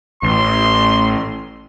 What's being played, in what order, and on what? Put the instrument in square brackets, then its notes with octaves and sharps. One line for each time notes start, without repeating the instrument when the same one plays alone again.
[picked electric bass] A1 [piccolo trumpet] C6